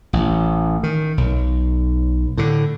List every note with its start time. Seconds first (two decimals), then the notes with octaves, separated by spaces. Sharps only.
0.13 A1
0.83 D#3
1.17 B1
2.37 A2 D3